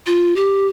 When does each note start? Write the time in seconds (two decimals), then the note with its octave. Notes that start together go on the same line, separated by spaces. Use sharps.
0.06 F4
0.36 G4